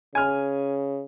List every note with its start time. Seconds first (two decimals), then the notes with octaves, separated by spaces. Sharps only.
0.15 C#3 G#5 F6